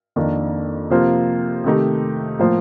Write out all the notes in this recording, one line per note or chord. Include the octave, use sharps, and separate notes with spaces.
F2 D#3 A#3 D4
C3 F3 A#3 F4 C5
C3 D#3 A3 D#4 G4
A2 F3 A#3 F4 C5